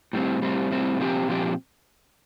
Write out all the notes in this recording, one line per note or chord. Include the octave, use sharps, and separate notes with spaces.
A2 G3 C4
A2 G3 C4
A2 G3 C4
A#2 F3 C4 G4
A#2 F3 C4 G4